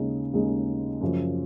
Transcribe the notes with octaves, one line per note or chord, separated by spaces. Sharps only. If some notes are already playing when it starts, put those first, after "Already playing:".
Already playing: D#2 C#3 G#3 D#4
D#2 C#3 G#3 D#4
F#2 C#3 F3